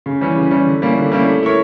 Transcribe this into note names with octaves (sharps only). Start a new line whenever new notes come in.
C#3
E3 G3 C#4
C#3
E3 G3 C#4
D3
G3 A#3 C#4 E4
D3
G3 A#3 C#4 E4
A3
E4 A#4 C#5